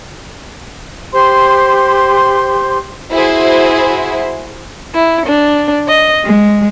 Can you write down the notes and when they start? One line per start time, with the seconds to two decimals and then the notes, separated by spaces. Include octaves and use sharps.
1.12 G4 C5 C6
3.11 E4 F#4 G#4 C5
4.94 E4
5.26 D4
5.87 D#5
6.24 G#3